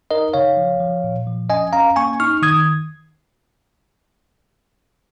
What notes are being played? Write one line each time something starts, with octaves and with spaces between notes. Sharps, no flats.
D#4 A#4 D#5
C#3 C#5 F5
F3
F3
A#2
F3
C#4 D#5 G#5
C#4 F5 A#5
A#3 G#5 C#6
D#4 C#6 F6
D#3 D#6 G#6